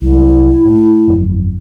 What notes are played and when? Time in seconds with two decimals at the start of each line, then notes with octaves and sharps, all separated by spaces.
0.02 C2 F#3 E4
0.65 A2
1.08 G1 F2 F#3